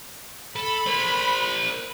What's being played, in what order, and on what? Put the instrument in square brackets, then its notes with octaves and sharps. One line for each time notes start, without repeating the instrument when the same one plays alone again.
[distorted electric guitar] A4 [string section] B5
[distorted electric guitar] A#4 C5